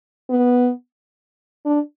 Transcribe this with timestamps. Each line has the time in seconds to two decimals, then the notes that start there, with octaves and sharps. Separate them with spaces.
0.30 B3
1.65 D4